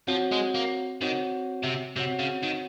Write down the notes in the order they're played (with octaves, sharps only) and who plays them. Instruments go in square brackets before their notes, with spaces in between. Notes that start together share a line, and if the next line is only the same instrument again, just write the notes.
[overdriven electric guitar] F3 [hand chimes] C4 F#4 C#5 F#5
[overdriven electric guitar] G#3
A#3
[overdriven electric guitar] D#3 [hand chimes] C4 F#4 C#5 F#5
[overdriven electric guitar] C3
[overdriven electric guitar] C3 [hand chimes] C4 F#4 C#5 F#5
[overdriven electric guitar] C#3
D#3